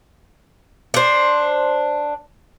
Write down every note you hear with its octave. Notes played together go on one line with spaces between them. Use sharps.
D4 C5